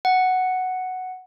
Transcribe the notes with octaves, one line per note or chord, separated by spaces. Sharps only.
F#5